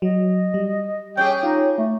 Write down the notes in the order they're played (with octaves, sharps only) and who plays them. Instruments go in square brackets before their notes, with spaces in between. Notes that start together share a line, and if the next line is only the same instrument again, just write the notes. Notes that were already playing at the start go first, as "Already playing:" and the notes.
[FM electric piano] F#3 [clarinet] D#5
[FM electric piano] G3
[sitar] C#4 G4 G#4 [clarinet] G5
[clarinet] D#4 [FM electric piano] F4
[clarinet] A3